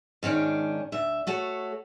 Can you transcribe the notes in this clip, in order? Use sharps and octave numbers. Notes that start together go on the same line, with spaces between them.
G#2 D#3 C#4 D4
D2 E5
A3 F#4 A4 C#5